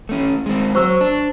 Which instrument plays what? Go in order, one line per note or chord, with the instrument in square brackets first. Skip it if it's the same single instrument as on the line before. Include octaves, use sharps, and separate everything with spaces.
[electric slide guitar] A3 C#4
G#3 C4
[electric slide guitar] F#3 [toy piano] C5 C#6 E6
[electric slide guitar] D4